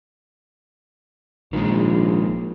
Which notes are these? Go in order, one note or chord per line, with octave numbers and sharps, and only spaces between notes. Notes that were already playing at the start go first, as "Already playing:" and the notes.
A#1 D#3 F3 G#3